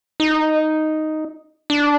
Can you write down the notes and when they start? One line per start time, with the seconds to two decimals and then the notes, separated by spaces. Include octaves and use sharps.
0.20 D#4
1.70 D4